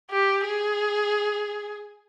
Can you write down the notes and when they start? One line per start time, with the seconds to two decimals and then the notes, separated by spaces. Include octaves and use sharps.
0.11 G4
0.46 G#4